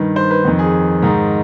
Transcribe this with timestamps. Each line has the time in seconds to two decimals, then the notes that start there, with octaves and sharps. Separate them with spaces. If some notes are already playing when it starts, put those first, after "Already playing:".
Already playing: G2 D#3 B4
0.16 C5
0.31 B4
0.45 F2 D#3
0.59 G#4
1.02 G#2 D#3